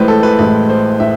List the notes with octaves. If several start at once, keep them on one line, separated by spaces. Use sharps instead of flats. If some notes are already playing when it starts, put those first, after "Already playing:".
Already playing: A1 A2 E3 G#3 B4 C5
A4
B4
A1 A2 E3 G#3 B4
C5
A2 E5